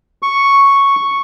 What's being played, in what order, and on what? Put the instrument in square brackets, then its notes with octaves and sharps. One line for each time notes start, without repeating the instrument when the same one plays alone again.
[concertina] C#6